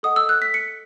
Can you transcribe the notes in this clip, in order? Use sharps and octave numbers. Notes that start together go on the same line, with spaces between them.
A4 D#5 F#5 D#6
E6
F#6
B6
C#7